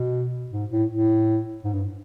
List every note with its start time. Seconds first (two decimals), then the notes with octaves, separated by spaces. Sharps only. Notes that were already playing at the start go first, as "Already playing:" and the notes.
Already playing: B2
0.52 G#2
0.71 A2
0.89 A2
1.64 G#2
1.73 G2